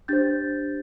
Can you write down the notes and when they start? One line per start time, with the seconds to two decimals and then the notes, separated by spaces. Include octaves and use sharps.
0.08 D4 G4 C5 G6 A6